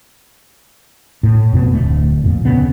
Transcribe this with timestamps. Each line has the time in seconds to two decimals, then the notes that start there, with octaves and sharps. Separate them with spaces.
1.23 A2
1.53 F2 B2
1.72 D1 D2 A3
2.24 F2 A#2
2.45 D2 C#3 B3 C4